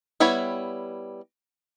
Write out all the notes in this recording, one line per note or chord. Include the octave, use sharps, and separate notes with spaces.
G3 B3 E4 C#5 B5